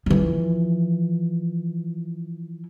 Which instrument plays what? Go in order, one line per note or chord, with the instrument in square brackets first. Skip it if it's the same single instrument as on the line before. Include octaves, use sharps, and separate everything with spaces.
[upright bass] E3 F3